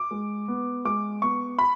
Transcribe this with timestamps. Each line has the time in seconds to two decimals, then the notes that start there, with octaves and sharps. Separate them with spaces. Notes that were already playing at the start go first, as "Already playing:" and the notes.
Already playing: D6
0.11 G#3
0.48 B3
0.85 G#3 D6
1.22 B3 C#6
1.59 B5